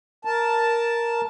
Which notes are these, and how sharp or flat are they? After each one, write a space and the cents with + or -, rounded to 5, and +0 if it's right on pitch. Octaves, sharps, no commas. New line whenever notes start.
A#4 +5 A5 +0